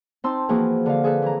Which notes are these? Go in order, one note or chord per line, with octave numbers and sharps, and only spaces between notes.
C4 D#4 A5 C6 E6
E3 F3 A#3 F#4 G#4
D3 F5
G#4 A4 B4
E3 A#5